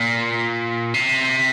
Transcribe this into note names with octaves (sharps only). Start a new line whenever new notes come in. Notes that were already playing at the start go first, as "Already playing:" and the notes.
Already playing: A#2
C3